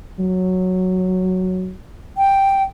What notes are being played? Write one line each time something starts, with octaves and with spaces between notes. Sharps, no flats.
F#3
G5